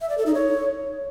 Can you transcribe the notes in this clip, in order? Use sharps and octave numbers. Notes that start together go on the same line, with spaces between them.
E5
D5
A4
D#4
C#5